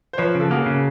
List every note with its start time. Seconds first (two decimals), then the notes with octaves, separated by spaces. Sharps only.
0.13 C5
0.18 F3 B4 C#5
0.35 C#3
0.40 A4
0.51 A#3 F#4 G#4
0.66 C#3